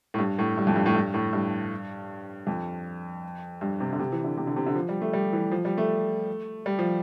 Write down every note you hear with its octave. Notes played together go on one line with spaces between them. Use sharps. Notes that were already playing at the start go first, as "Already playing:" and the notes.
A2
G2
A2
G2
F2
G2
A2
G2
A2
G2
F2
G2
C3
D3
C3
E3
D3
C3
D3
C3
D3
F3
G3
A3
G3
E3
F3
G3
A3
G3
F3